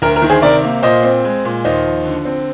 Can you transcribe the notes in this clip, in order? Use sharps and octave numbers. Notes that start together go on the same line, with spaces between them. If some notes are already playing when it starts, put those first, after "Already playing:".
D2 A#4
A#4
D#3
G#4 C5
C3 A#4 D5
A#3
A#2 C5 D#5
C4
G#3
A#2
D#2 C5 D#5
F3
D3
C4